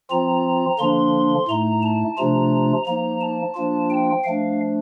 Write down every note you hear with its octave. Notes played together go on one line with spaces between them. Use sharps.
F3 C4 F4 A#5
D3 F3 A#3 D4 C6
A2 A3 D#4 A#5
A5
C3 F3 A3 D4 F4 A#5
F3 A#3 D#4 A#5
A5
F3 A#3 D4 F4
G5
F3 A3 D4 F5